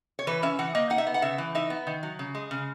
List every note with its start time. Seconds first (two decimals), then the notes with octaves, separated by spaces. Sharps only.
0.19 C#5
0.27 E3 B4
0.42 C#4 E5
0.59 E3 F#5
0.75 A#3 D#5
0.90 D#4 F#5
0.98 E5
1.07 B3
1.14 F#5
1.22 C#3 E5
1.38 E3
1.55 D#4 E5
1.70 B3
1.87 D#3
2.03 F#3
2.19 C#3
2.35 G#3
2.51 C#3